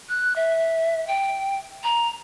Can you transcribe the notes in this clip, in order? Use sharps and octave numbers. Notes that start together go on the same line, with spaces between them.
F#6
E5
G5
A#5